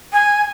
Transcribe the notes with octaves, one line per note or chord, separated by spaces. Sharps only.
G#5